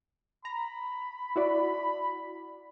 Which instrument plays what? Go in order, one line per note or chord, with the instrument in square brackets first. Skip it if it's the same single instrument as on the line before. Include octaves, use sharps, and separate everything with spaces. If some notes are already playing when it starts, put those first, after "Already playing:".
[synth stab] A#5 [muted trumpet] B5
[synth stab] E4 F#4 D5